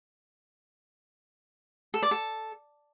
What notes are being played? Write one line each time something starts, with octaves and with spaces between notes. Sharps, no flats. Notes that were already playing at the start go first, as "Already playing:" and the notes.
A4
D5
A4